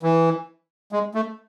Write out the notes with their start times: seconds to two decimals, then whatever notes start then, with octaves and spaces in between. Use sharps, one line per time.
0.03 E3
0.92 G#3
1.15 A3